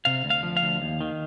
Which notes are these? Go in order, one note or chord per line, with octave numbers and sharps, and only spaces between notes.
C3 F5
D2
F5
F3
F5
D2
D#2
D#3